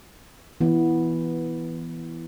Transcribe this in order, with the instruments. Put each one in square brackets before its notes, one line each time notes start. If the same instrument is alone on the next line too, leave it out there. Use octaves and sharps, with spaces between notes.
[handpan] E3 B3